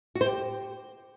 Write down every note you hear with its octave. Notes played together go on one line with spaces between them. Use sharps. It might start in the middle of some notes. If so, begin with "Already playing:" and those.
F#4
C5
G4